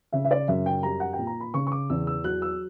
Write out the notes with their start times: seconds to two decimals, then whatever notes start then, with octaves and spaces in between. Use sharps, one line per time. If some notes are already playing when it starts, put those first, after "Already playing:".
0.12 C#3 E5
0.24 E5
0.31 D5
0.48 F#2 E5
0.66 G5
0.83 G3 A#5
1.00 F#5
1.13 G5
1.19 A#2
1.27 A#5
1.40 B5
1.54 C#3 C#6
1.67 C#6
1.72 D6
1.90 E2 E6
2.07 E6
2.24 F#3 F#6
2.42 E6